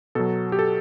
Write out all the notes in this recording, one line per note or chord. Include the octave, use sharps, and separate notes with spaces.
B2 F#3 A4
G4
A4